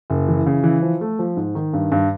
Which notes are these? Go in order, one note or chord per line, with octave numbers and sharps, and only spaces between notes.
F#1
E3
C#3
E3
F3
A3
F3
G#2
D#3
G2
G2